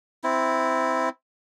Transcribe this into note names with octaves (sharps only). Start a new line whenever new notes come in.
C4 E4